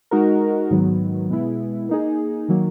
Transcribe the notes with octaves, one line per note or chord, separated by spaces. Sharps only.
G#3 D#4 F#4 A#4
G#2 D#3 F#3 B3
B2 G#3 B3 E4
A#3 D#4 G#4
D#3 F#3 A#3